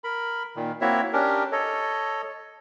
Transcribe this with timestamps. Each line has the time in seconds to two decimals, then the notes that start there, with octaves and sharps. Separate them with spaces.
0.04 A#4 B5
0.56 A#2 D#3
0.81 A#3 C4 E4 F#4 C#5 E5
1.13 C#4 D4 G4 A#4
1.52 A4 C#5 D#5